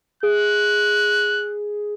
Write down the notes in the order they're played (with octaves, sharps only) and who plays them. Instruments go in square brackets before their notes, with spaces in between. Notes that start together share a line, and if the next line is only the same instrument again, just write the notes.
[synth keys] G#4 [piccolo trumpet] F#6